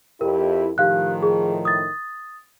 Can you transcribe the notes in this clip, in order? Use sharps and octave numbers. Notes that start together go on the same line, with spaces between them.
F2 E4 G4 A#4
A2 D#3 F3 G4 F5 F#6
G#4
D#6 A6